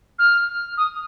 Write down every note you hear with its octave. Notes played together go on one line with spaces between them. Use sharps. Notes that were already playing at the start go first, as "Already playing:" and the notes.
F6
D#6